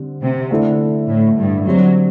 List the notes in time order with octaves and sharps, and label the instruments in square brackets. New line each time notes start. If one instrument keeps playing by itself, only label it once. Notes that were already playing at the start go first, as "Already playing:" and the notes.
Already playing: [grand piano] D3 G3 C4
[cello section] C3
[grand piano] D3 A3 E4 A4
[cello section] A2
G2
[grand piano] D3 G3 C4 G4 [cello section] F#3